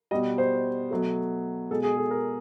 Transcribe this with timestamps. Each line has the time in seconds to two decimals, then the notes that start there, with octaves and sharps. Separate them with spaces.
0.11 B2 G3 D#5
0.38 C5
0.91 B2 F#3 A3
1.71 B2 G#3 A4
1.83 G#4
1.97 A4
2.11 A#4